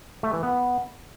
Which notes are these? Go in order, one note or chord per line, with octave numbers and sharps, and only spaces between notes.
A3
E3
B3